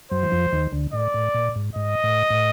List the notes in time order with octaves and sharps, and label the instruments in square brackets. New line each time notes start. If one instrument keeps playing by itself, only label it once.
[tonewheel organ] F#2 F#3 [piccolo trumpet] C5
[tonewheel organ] E3
F2 F3
D#2 D#3
D2 D3
[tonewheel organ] A2 [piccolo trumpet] D5
[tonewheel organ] A2
A#2
G#2
[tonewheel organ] G#2 [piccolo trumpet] D#5
[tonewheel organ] A2
A2